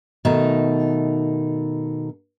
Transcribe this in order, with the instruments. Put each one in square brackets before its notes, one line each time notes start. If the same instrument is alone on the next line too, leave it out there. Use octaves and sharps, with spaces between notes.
[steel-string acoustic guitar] B2 D#3 A3 D#4